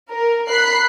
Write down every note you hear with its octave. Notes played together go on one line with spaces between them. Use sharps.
A#4
B5 F#6 C7